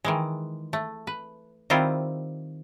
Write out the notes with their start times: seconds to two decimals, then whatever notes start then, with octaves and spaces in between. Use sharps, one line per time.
0.04 D#3 E3 G#3
0.73 A3
1.07 B4
1.70 D#3 G3 C4 E4 F4